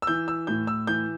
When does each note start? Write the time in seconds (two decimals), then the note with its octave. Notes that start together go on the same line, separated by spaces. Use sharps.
0.02 E6
0.07 E3 G6
0.28 E6
0.47 A2 G6
0.67 E6
0.87 E3 G6